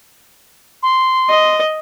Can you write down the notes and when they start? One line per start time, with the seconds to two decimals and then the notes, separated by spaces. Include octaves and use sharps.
0.83 C6
1.30 D#5